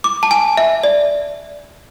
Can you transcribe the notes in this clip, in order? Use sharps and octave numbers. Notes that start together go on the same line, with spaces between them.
D6
A5
G#5
E5
D5